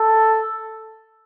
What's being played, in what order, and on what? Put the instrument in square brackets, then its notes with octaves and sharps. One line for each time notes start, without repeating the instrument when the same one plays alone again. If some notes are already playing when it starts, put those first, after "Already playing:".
Already playing: [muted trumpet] A4